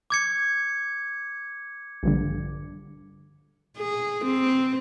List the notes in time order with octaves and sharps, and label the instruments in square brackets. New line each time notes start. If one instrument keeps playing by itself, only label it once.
[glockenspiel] D6 G#6 C#7
[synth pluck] A#1 G2 D3
[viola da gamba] G#4
C4